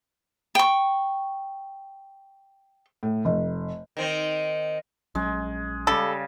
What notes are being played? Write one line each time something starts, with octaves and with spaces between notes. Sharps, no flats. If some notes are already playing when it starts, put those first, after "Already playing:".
G5 C#6
A2
F1
D#3 C4
A#1 F#3 G#3 C#4
C#3 G3 A4